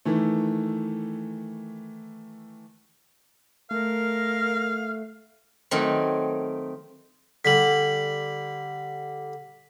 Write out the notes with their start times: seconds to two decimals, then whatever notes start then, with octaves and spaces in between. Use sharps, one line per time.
0.05 D#3 E3 A3
3.71 A3 A#4 F5
5.71 D#3 F#3 A3 C4
7.45 D3 G3 B6 F#7